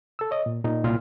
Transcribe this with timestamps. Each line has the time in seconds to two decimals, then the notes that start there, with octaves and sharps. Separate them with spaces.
0.19 A4 E6
0.31 C#5 D#5
0.46 A#2
0.64 A#2 D#4
0.84 C2 A#2 E4 C6 F6